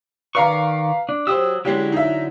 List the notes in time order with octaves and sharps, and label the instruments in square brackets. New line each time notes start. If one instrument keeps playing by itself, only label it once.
[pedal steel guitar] D#3 D5 C#6 [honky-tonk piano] B4 F5 A#5
[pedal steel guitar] D4
[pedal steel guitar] F#3 D#6 E6 [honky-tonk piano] G4 C5
[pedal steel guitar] D3 F#3 E4 [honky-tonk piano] G#3 C#4 G4
[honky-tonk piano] D#4 E5